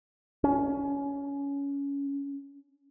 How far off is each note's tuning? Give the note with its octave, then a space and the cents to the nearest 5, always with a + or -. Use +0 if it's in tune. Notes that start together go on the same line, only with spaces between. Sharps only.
C#4 +20